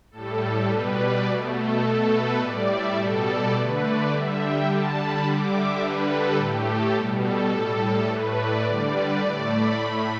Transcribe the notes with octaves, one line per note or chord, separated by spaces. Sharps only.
A2 G3 A4
A4
B2 G3 B4
D5
B2 A3
A4
B2 A3 A4
B4
A2 G3 D5
E5
B2 G3 A4
D5
D3 A3 B4
D5
D3 G3 E5
G5
D3 G3 A5
B5
D3 G3 D6
E5
D3 G3 B4
A4
A2 A3 G4
A4
B2 G3
A4
A2 G3 A4
A4
A2 A3 B4
D5
D3 G3 D5
B4
A2 A3 D5
B5
A2 A3